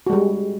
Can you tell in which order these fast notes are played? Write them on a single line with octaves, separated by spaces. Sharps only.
F#4 G#3 G3